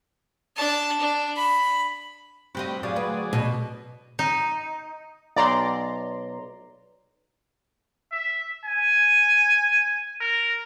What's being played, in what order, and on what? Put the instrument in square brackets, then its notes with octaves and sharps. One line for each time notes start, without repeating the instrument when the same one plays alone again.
[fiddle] D4 A5
D4
B5
[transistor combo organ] G2 C4 B5 [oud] F#4 G4 D#5
[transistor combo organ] F#3 G#4 D5 [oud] D4 F4
[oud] D2 B4
[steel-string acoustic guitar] B2
[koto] D#4
[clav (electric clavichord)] B1 [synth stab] D5 A#5 C6
[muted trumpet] E5
G#5
A#4